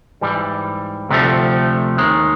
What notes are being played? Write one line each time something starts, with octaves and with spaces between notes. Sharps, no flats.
G#2 E3 G3
D2 C3 F3 A3
D#2 D#3 G#3